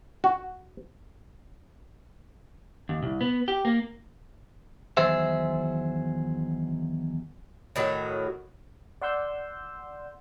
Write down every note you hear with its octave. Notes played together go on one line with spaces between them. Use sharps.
F#4
D#2
C2
B3
G4
A#3
E2 D#3 F#3 G#4 C5 E5
A2 D#3 F#3 F#4
D5 F#5 C6 E6 G6